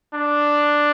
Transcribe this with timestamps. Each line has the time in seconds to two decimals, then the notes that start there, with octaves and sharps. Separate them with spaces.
0.14 D4